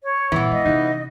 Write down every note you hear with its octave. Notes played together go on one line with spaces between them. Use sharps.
C#5
G2 A#2 E3 B3
G#3 D#5
C3 C#4 D#4